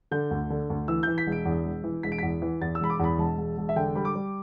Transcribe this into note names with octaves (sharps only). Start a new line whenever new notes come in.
D3 G6
D2
D3
D2
E3 E6
E3 G6
B6
E1
D7
E2
E1
E3
E1 B6
D7
E2 B6
E3
E2 A6
E6
E1 B5
D6
E2 B5
E1 A5
E1
E1
E5
D3 G5
G3 B5
D6
G3